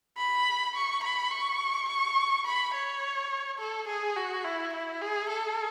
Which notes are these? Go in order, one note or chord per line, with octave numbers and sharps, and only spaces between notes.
B5
C#6
B5
C#6
C#6
B5
C#5
A4
G#4
F#4
E4
E4
G#4
A4